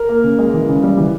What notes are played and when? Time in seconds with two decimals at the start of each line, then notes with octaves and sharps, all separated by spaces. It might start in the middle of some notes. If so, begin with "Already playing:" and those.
Already playing: A#4
0.09 A#3
0.24 C#3
0.39 G#3
0.54 E3
0.69 C#3
0.83 G3
0.98 E3